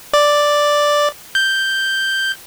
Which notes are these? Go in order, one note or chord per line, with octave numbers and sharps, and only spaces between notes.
D5
G6